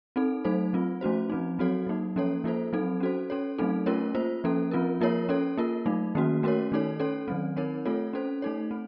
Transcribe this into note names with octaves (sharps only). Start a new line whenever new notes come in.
C4 D#4 A4
F#3 A3 D#4 A4 C5
F#3 C4 F4
F3 A3 C#4 F#4 C5
F3 C4 D#4
F#3 C4 F#4 A4 C#5
F#3 A#3 D#4
F3 A#3 C#4 A4 C#5
F3 A#3 F4 A4 C5
F#3 C4 D#4 A4
C#4 F#4 A4 C5
C#4 A4 C#5
F#3 A3 C4 D#4 A4
A3 C#4 F4 A#4 C#5
A#3 F4 C5
F3 A#3 C#4 A4
F3 C4 F4 A#4
F3 A#3 F4 A#4 C#5
C#4 A4 C#5
A#3 F4 A#4
F#3 A3 D#4
D#3 A#3 C#4 F#4
A3 C#4 F#4 A#4 C#5
D#3 A3 D#4 A4 C#5
C#4 A4 C#5
D#3 F#3 C4
C4 D#4 A#4 C#5
A3 C4 F4 A4 C#5
C#4 A4 C5
A3 D#4 A4 C#5
C4